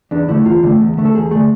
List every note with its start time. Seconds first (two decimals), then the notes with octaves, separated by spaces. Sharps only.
0.11 E2 D4
0.28 D3 A3 E4
0.45 E2 F4
0.63 D3 A3
0.80 E2
0.97 D3 A3
1.05 A4
1.15 E2 G#4
1.31 D3 A3 G#4